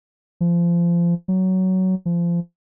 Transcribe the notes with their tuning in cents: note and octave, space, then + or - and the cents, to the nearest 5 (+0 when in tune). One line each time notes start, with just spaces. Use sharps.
F3 -25
F#3 +15
F3 -25